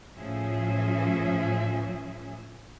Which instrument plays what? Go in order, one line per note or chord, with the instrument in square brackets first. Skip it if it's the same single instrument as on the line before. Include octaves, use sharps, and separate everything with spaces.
[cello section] A2 F3 C#4 G#4 E5